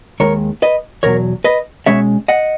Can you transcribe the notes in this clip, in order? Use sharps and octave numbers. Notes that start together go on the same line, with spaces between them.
D#2 D#3 G#3 A#4 C#5
B4 D#5
E2 B2 F#3 A#4 C#5
B4 D#5
B2 G#3 C#4 C#5 E5
D#5 F#5